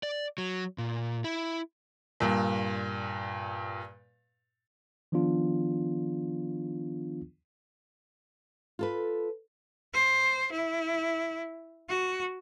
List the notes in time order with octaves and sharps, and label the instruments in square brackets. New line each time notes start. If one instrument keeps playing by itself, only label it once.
[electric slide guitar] D5
F#3
A#2
E4
[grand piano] G2 A#2
[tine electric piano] D#3 F3 B3 D4 F4
[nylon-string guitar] F4 A4 B4
[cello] C5
E4
F#4